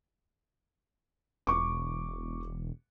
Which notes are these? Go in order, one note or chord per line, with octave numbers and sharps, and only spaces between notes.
E1 C#6 D6